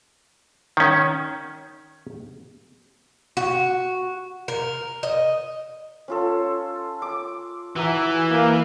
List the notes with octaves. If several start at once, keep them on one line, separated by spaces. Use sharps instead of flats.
D#3 C#4
F#4
A#4
D#5
C#4 F4 A4
D6
E3 F#4 E5 A#5
A#3